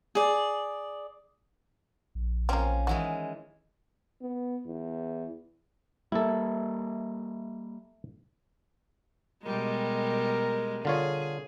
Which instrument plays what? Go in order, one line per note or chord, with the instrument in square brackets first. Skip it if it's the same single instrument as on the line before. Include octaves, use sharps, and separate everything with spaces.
[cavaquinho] G#4 D5
[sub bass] A#1
[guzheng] F3 C#4 [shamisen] A#3 C4
[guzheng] D#3 E3 G#3 [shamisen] F#4
[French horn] B3
E2
[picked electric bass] G3 A#3 [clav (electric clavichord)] E4 A4
[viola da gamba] B2 G3 G#3 [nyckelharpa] A#4
[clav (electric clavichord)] D3 F4 C#5 [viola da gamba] G#4